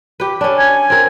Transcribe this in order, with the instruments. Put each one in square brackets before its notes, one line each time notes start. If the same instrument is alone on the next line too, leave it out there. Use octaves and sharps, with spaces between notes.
[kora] G4 B4
C#4 D4
[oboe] G#5
[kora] C4 A#4